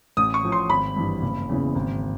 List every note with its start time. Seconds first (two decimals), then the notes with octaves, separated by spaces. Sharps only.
0.17 A1 D#6
0.34 C#6
0.43 A2 F3
0.52 C6
0.69 G#1 B5
0.96 G2 E3
1.22 F#1
1.49 E2 C#3 E3
1.75 G#1